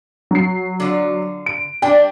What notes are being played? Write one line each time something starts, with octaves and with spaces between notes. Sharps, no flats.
F#3 C7
D3 F4
D7
G3 D4 G5